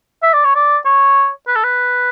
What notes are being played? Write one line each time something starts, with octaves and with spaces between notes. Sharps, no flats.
E5
D5
C#5
D5
C#5
B4
A4
B4